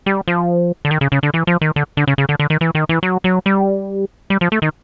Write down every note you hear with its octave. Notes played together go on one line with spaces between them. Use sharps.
G3
F3
D3
D#3
C#3
C#3
D3
E3
F3
D#3
D3
D3
C#3
C#3
D3
D3
D#3
E3
D#3
E3
F#3
F#3
G3
G3
F3
A3
D#3